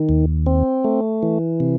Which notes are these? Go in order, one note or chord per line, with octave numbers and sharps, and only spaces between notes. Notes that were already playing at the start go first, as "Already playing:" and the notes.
Already playing: D#3
D#2
C4
A3
E3
C3